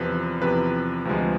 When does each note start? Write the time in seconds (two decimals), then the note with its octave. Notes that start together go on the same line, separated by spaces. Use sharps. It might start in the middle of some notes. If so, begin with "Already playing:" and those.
Already playing: E2 C3 F3 B4
0.41 E2 C3 F3 B4
1.05 D2 C3 F3 G#3